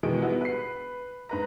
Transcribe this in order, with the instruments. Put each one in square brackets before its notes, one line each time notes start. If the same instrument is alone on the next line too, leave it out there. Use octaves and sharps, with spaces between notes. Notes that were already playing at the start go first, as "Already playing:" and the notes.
[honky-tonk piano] B2 D#3 E3 G#3 D7
G3 B3 E4 F#4 G#4
B4 C7
G#2 B4 A#5